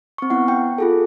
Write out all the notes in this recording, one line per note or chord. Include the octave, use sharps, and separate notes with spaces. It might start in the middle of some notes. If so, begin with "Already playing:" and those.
C4 C#6
B3 E4 F#5
G5
F4 G#4 A4